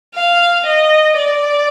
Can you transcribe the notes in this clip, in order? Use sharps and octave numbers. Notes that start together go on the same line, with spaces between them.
F5
D#5
D5